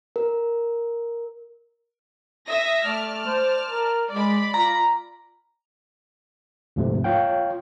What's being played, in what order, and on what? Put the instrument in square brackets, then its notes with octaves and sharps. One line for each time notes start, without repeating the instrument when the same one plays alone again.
[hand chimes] A#4
[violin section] E5 D#6 A#6
[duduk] A3 [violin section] D5 A5 F6
[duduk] C5
A#4
[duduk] G#3 [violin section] D5 B5
[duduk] F4 [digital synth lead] A#5
[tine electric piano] D2 G#2 C3 F3 A3
F4 C#5 F5 G5